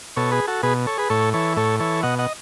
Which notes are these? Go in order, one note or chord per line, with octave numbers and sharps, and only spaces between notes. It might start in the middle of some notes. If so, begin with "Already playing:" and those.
B2 A4 C#5
G#4 B4
F#4 A4
B2 G#4 B4
A4 C#5
G#4 B4
A2 A4 C#5
E3 A4 C#5
A2 A4 C#5
E3 A4 C#5
B2 D#5 F#5
D#5 F#5